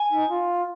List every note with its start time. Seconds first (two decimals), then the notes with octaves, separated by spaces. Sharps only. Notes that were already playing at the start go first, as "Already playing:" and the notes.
Already playing: G#5
0.11 D#4
0.29 F4